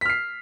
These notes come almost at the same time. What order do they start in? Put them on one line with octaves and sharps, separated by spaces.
B6 F6 C7